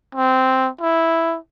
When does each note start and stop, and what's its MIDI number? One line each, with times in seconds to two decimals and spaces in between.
0.15 0.69 60
0.81 1.37 64